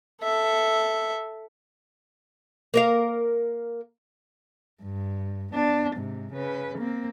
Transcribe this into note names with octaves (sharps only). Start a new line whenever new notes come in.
A4 E5
A#3 A#4 F5
G2
B3 D4
G#2 C3
C#3 B4
A#3 C4